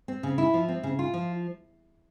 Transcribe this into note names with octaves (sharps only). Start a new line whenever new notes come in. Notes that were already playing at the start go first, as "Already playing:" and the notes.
C4
C#3
E4
F3
C4
C#3
F4
F3